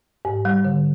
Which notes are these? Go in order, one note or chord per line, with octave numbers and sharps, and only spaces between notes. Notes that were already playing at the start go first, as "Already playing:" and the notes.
G#2
G3
D3